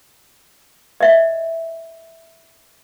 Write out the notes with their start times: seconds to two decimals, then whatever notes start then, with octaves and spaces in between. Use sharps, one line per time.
1.01 D#5 E5